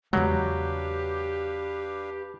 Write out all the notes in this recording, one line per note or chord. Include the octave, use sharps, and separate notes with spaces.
E2 C#3 F#3 G#3 D4 G4 B4 F5